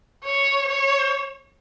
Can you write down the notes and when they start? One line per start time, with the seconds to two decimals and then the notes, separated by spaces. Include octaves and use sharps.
0.24 C#5
0.68 C#5